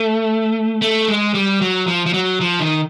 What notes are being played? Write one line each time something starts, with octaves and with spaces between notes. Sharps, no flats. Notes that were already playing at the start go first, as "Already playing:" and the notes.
Already playing: A3
A3
G#3
G3
F#3
F3
F3
F#3
F3
D#3